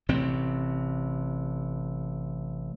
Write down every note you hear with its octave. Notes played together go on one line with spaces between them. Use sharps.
A1 C3 C4